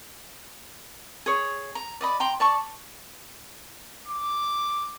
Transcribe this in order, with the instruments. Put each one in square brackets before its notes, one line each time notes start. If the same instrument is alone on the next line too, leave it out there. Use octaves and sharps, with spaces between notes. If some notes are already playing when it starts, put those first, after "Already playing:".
[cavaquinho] G#4 C#5
A#5
D5 D#5 B5
G5 A#5 C6
D5 A5 C#6
[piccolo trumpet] D6